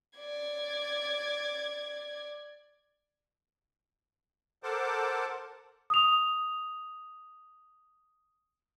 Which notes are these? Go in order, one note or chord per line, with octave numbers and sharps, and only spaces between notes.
D5 G#6
A4 A#4 C5 F#5 A5 D6
D#6 F7